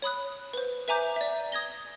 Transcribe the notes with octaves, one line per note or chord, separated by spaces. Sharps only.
C#5 B5 D#6 F#6
B4 C5
B4 E5 G#5 A#5 D6 G6
D5 E5
D#6 G#6 A#6 G7